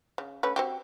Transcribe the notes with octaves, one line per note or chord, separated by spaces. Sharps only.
C#3
A3 C#4 B4
C4 F#4 G4